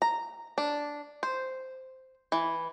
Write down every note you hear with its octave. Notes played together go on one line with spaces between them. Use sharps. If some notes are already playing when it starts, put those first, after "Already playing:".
A#5
D4
C5
E3